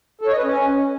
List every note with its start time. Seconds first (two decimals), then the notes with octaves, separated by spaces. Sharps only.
0.21 A4
0.27 C#5
0.32 D#5
0.38 B4
0.43 C#4